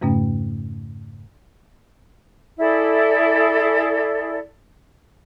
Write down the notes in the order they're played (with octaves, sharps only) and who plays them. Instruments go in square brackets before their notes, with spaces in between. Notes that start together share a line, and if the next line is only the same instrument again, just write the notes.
[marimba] F2 G#2 C#3 A3 C#4
[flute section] E4 G#4 A4 D5